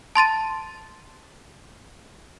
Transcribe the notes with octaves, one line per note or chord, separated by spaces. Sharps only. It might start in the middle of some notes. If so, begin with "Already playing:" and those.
A5 C6 A6 D#7